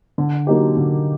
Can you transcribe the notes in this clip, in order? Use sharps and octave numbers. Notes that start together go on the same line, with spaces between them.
D3
F#3 A#3 D#4 G4
D3